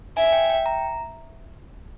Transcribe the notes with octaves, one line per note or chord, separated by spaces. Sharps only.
E5 G#5
G5
G5
A#5